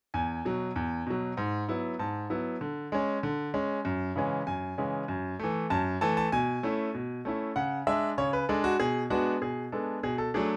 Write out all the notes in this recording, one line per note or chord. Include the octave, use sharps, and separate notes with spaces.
E2 G#5
B2 F#3
E2
B2 F#3
G#2
F#3 B3 E4
G#2 A5
F#3 B3 E4
D3
G#3 C#4
D3
G#3 C#4
F#2
C#3 E3 G#3 C#4
F#2 G#5
C#3 E3 G#3 C#4
F#2
E3 A3
F#2 A5
E3 A3 A5
A5
B2 G#5
A3 C#4 E4
B2
A3 C#4 E4
C#3 F#5
G#3 D4 E5
C#3 C#5
B4
G#3 D4 A4
F#4
B2 G#4
G#3 B3 D4 F#4
B2 G#4
G#3 B3 D4 A4
B2 G#4
A4
F#3 A3 D4 G#4